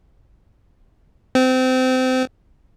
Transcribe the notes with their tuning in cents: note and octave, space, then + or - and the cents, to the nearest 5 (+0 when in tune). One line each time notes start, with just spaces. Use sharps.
C4 -25